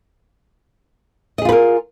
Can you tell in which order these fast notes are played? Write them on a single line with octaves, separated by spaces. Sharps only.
D#5 G#4 F4 B4 A#4